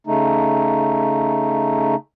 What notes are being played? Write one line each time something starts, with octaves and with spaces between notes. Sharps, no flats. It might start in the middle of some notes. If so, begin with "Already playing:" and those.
C#3 A3 D#4